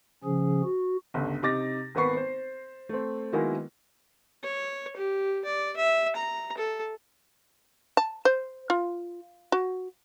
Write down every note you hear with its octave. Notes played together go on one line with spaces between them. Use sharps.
C#3 F3 C#4 G#4
F#4
G1 C#2 D3
C3 D#4 D6 A6 A#6
G#1 A#3 B3 B4 C#6 C7
C5
A3 C4
D#3 F#3 G#3 A#3 B3 E4
C#5
G4
D5
E5
A#5
A4
A5
C5
F4
F#4